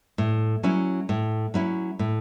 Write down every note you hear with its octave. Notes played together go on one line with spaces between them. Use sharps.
A2
F#3 C#4 E4
A2
F#3 C#4 E4
A2